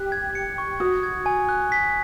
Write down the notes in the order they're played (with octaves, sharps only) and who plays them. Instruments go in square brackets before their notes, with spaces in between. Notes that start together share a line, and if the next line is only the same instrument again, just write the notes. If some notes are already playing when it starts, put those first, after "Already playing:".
Already playing: [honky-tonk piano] G4 [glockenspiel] F#6
[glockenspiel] G#6
C#7
C#6
[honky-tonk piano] F#4 [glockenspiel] D#6
[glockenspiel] G#6
G#5
F#6
B6